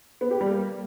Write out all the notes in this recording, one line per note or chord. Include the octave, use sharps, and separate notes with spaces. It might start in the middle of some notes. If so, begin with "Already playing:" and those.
B3
G4
G3
A#3